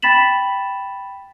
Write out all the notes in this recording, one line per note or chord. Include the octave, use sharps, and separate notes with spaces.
G5 B5 A6 B6 E7 F#7